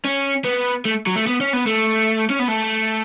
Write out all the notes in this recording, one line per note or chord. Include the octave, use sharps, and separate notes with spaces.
C#4
B3
A3
F#3
A3
B3
C#4
B3
A3
C#4
B3
A3